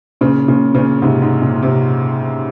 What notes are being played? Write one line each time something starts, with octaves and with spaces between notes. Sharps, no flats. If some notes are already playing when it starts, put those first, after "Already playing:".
A#2 C#3
A#2 C#3
A#2 C#3
G#2 C3
G#2
A#2
C3